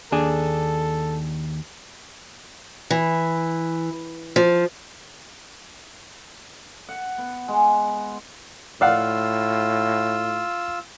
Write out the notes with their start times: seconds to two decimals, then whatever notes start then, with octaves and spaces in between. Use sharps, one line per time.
0.12 D#2 D4 G#4 A4
2.90 E3
4.36 F3
6.89 F#5
7.18 B3
7.48 G#3
8.81 A2 F4 D5 F5 F#5 E6